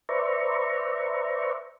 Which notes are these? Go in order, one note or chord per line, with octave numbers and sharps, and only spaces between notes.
B4 C5 D5 E5 A#5 C#6